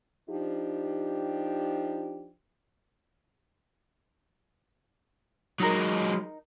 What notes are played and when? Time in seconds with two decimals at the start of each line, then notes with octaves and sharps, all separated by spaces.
0.30 F3 D4 D#4 G4
5.60 F#3 G#3 D#4 A#4